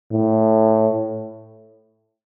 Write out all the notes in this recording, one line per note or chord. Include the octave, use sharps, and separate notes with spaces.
A2